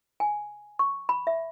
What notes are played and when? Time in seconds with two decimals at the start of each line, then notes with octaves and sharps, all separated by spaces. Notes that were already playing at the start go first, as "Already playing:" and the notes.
0.20 G#5
0.79 C#6
1.09 B5
1.27 E5